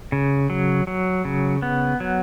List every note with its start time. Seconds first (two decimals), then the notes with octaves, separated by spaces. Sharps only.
0.12 C#3
0.50 F#3
0.87 F#3
1.25 C#3
1.62 B3
2.00 F#3